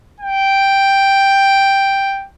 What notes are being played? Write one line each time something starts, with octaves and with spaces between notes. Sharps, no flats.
G5